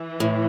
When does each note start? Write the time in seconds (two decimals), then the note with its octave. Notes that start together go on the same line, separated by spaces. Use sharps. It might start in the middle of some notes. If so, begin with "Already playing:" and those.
Already playing: E3
0.20 A2